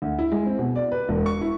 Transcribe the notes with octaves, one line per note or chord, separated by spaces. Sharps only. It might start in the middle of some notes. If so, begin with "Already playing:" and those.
D2
E4
G#3
C4
B2
D5
B4
E1
C#6
E4